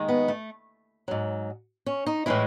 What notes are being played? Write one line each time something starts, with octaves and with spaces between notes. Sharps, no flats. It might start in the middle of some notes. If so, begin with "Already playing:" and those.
Already playing: D#2 D#3 G#3
B3
A3
G#2 F#3
C#4
D#4
A2 E3 G#3 E4